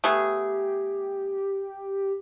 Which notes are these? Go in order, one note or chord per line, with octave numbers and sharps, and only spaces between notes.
A3 B3 G4 G#4